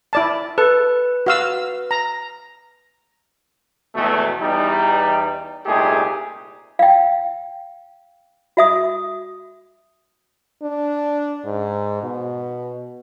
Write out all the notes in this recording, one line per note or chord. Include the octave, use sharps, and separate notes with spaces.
E4 D5 A5
A4 B4
F#4 F5 E6
A#5
G#1 E2 B2 E3 A3
E2 G3 D#4
C2 A#2 A3 D#4 G4 G#4
F5 G5
F#4 E5 D#6
D4
G#2
B2